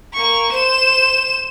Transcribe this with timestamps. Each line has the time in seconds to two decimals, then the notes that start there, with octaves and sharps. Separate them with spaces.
0.14 A#3 C#6
0.52 C5 E7